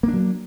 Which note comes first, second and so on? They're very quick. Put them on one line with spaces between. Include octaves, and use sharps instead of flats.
A#3 D4 F#3